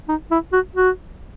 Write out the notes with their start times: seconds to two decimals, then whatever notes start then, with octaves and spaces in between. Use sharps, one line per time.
0.08 D#4
0.31 E4
0.53 F#4
0.76 F#4